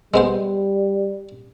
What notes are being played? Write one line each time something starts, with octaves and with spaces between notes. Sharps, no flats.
G3 G#3 B3 C5